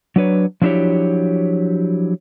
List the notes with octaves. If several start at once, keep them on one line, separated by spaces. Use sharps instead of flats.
F#3 D4 B4 C#5
F3 F#3 D4 E4 G4 C#5